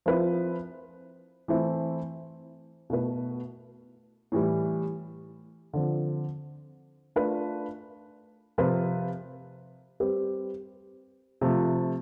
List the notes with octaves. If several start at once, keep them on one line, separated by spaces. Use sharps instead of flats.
F3 C4 E4 B4
E3 A3 C4 E4
B2 A3 E4 B4
A2 E3 G3
D3 F3 C4
A3 D4 F4 B4
C3 F3 C4 F4 B4
G3 C4 G4 B4
C3 F3 A3